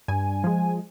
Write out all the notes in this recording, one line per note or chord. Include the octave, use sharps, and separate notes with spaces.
G2 G#5
F3 G#3